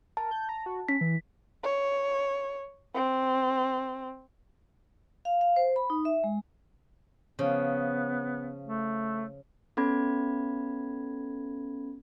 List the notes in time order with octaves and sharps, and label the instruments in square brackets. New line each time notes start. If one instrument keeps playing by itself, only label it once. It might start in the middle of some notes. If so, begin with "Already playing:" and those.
[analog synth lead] A#4 [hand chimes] A5
[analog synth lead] G6
A#5
F#4
[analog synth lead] C#4 [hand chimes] B6
[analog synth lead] E3
[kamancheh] C#5
C4
[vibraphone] F5
F5
C5
B5
D#4
E5
G#3
[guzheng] C#3 F3 [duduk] B3
[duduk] A3
[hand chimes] B3 C#4 A4 B5 G#6